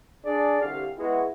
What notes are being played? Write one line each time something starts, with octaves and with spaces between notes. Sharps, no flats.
D4 G#4 D5
C2 D3 G4 F5
G#3 B3 E4 F#4